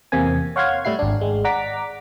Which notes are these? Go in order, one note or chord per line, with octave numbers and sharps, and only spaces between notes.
E2 C3 A#3 C4 G#5
C#5 F5 F#5 C6 F6 G#6
A2 G3 E4 C7
G#1 D4
G#1 G#3
D5 F#5 A#5 D6 B6